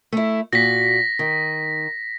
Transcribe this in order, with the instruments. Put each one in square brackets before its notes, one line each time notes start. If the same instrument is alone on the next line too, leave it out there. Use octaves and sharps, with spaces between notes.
[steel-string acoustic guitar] A3 E4
[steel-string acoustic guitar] A#2 F#4 [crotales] A#6 B6
[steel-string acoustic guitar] D#3